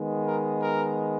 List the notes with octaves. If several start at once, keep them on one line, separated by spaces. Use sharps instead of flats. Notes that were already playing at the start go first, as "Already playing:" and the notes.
Already playing: D#3 G#3 B3
A#4
A#4